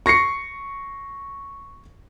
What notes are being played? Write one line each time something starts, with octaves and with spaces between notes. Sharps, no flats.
C#6 A#6 C7 C#7